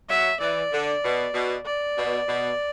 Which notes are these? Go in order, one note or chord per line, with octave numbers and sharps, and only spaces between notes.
F#3 E5
E3 D5
D3
B2
B2
D5
B2
B2